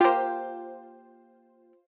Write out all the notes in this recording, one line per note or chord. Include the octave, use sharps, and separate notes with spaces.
A#3 F4 G4 C5